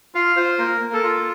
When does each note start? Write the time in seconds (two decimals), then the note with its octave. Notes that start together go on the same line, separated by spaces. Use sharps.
0.15 F4 F5
0.36 F4 C5
0.59 A#3 A#4
0.81 A#3
0.93 A4
1.03 F4